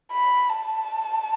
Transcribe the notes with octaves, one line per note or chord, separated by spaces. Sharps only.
B5
A5